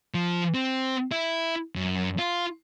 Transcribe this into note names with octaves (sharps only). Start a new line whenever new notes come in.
F3
C4
E4
F#2
F4